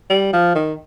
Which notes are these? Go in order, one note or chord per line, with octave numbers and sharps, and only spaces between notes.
G3
F3
D#3